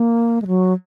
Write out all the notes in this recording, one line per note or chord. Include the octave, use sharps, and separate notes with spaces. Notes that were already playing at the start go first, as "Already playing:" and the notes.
Already playing: A#3
G#3
F#3